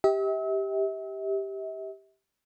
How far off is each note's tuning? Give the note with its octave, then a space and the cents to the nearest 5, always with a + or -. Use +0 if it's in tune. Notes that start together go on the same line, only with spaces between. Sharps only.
G4 +0 E5 -40